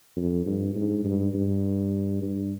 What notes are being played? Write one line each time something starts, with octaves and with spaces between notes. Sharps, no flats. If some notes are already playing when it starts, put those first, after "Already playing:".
F2
G2
G#2
G2
G2
G2